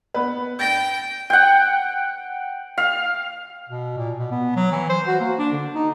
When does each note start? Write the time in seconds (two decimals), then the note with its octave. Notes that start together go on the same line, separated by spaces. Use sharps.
0.14 B3 B4
0.59 G5 G6 A6 A#6
1.30 F#5 G5
2.78 F5
3.69 B2
3.97 A#2
4.18 B2
4.31 B3
4.56 F#3
4.72 E3
4.89 C5
5.07 F#4
5.20 A#3
5.38 D4
5.52 D3
5.75 D#4